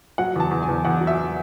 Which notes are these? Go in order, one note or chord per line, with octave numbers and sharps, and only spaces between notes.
F#3 F#5
E2 A5
E2
G#5
E2
E2 F#5
F#3
E5